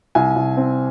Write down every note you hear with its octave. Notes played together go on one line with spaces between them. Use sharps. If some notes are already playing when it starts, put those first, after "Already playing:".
C2 G#5
C2
C4